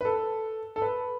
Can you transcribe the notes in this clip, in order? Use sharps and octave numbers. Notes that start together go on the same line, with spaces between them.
B4
A4
A4
B4